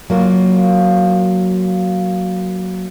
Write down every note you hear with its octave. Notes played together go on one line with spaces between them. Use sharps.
F#3 A#3 F4